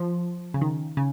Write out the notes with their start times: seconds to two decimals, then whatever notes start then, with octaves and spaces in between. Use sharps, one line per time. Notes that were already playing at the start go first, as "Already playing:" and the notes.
Already playing: F3
0.54 C#3
0.61 D#3
0.97 C#3